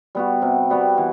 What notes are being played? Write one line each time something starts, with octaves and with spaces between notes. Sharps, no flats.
G3 B3 F#4
C3
G3 B3 F#4
E3